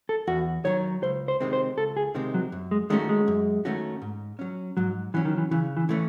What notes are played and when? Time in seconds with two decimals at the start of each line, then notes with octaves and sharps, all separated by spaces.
0.09 A4
0.27 E2 F#4
0.65 D#3 F#3 C#5
1.03 C#2 C5
1.28 C5
1.40 C3 D#3 G#3 C4
1.53 C5
1.78 C#2 A4
1.97 G#4
2.15 C3 D#3 G#3 C4
2.34 F#3
2.52 F#2
2.71 G#3
2.90 D#3 G#3 A3 C#4 F#4
3.09 G#3
3.28 F#2
3.65 D#3 A3 C#4 F#4
4.02 G#2
4.39 F#3 C#4
4.77 G#2 F#3
5.14 E3 F#3 C#4
5.25 D#3
5.38 E3
5.51 C#3 E3
5.77 E3
5.89 E3 A3 C#4